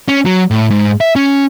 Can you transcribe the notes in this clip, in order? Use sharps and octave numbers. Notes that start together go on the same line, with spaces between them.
C#4
F#3
A2
G#2
E5
C#4